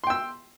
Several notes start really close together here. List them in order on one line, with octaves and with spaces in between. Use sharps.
C6 G5 E6